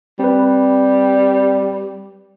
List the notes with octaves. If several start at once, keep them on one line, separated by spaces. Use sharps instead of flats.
G3 C4 B4